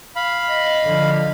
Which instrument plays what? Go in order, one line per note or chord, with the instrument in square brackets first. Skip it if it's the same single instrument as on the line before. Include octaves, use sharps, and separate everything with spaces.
[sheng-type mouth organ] F5 B5
[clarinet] D#5
[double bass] D3 F3